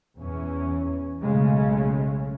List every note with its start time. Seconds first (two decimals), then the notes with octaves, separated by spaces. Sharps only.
0.19 E2 E3 C#4
1.20 B1 C#3 G#3 A3 C#4